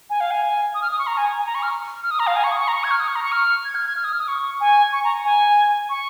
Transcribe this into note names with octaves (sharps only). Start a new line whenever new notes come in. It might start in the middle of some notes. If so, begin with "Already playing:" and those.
G#5
F5
G#5
D#6
F6
D#6
C#6
A#5
G#5
G#5
A#5
C#6
F6
F6
D#6
A#5
F5
G#5
C#6
D#6
C#6
A#5
C#6
G#6
F6
D#6
C#6
A#5
C#6
F6
G#6
F6
G#6
F6
D#6
F6
D#6
C#6
G#5
C#6
A#5
G#5
C#6